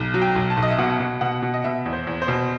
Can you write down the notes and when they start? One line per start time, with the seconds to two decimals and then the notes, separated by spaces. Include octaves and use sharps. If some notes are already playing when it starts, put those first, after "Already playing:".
Already playing: B1
0.14 F#3
0.22 G5
0.36 B1
0.50 A5
0.57 B1
0.62 D#5
0.70 E5
0.78 B2 F#5
1.00 B2
1.21 B2 F#5
1.42 B2
1.54 D#5
1.64 B2 E5
1.86 E2
1.93 C5
2.07 E2
2.22 C5
2.28 B2